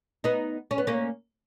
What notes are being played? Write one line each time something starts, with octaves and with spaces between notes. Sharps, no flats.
B3 D#4
C#4
B3
A#3 C#4